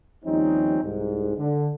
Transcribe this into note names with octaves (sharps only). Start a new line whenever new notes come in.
D#2 F3 G3 C4 C#4 D#4
C2 G#2
D3